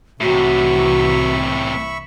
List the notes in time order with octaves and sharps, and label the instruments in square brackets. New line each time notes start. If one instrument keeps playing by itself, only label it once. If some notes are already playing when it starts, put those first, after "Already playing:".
[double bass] C2 E3 [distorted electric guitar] A2 C3 [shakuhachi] F#4 [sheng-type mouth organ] E5 B5 C#6